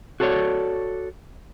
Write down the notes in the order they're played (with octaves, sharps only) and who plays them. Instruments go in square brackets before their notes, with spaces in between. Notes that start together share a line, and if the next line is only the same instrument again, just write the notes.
[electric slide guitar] F#4 G#4 A4 B4 C#5 D5